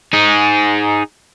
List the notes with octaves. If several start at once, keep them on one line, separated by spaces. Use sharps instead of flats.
D#4 G#4